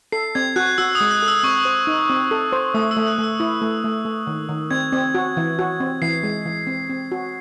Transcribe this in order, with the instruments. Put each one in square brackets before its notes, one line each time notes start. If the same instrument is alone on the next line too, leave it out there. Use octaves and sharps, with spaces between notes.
[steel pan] A4 [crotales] C7
[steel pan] C4 [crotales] G#6
[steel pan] F#4 [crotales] F#6
[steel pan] F#4 [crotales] E6
[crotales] D#6
[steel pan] G#3
[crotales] F#6
[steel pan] A4
[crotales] E6
[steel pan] C4 [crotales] C#6
[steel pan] C5
D#4
C4
A4
C5
[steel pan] A3 [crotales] D#6
[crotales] E6
[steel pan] A3
[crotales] F#6
[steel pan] A3 [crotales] E6
[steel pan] E4
A3
A3
A3
D#3
D#3
[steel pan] C4 [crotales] G#6
[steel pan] C4
F#4
E3
F#4
C4
[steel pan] E3 [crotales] C7
[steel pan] G#3
E3
C4
C4
F#4